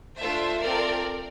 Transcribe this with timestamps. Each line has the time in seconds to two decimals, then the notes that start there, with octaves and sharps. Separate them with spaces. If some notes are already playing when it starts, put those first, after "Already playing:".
0.19 A3 D4 F4 A4 C5 E5
0.61 C4 F4 A4 A#4 D5